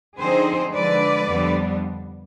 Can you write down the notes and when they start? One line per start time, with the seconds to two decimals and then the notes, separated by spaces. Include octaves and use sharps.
0.18 D3 F3 C4 D#4 G#4 C5
0.73 D3 F3 G#3 B4 D5
1.28 F2 D3 G3 B3 D4